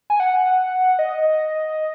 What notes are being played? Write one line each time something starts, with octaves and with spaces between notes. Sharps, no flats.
G#5
F#5
D#5